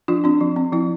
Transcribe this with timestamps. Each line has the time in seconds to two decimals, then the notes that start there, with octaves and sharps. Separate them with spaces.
0.08 F3 D4 F4
0.24 C4 D4
0.41 F3
0.56 C4
0.72 F3 E4